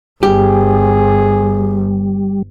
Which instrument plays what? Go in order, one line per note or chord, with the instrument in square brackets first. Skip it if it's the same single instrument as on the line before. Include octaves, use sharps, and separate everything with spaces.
[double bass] G1 [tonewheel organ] G3 [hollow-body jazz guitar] G4 [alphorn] G#4